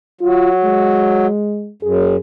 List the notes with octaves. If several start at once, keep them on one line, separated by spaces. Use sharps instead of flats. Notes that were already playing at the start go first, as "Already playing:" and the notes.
F#3 F4
G#3
F#2 G#4